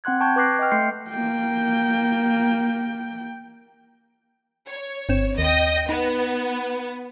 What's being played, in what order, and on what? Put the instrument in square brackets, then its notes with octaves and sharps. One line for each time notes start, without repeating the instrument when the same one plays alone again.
[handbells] C4 F#5 C6 F#6 G#6
G5 A5 C#6 G6 G#6
B4 C#6 D6 F#6 A#6 C7
D#5 G5 F6
A3 C6 G6 C7 C#7
[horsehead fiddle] A#3 G5
[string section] C#5
[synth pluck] G1 C4 E7
[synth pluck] D#2 [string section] D#5 G5
[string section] B3 [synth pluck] D#4